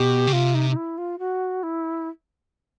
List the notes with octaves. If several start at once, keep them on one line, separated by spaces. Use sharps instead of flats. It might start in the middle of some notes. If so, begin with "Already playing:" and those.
Already playing: B2 G4
C#3
C3 F4
D#4
D#4
E4
F4
F#4
E4